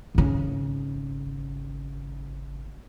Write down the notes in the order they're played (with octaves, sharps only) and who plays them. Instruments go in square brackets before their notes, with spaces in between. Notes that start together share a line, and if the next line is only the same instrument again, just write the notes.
[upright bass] G#1 C#3